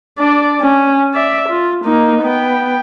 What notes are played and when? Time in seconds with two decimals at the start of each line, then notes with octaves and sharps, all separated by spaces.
0.19 D4 D5
0.61 C#4
1.14 D5 E5
1.49 F4
1.85 A#3 D#4
2.23 B3 G5